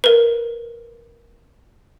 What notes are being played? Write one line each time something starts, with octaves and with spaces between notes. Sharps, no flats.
A#4 B4